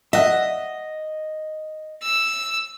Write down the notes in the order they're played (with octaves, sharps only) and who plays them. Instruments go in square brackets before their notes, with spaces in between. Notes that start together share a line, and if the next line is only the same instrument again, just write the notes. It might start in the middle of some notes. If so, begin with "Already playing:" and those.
[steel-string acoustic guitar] D#5 [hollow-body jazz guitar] E5 F#5
[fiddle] E6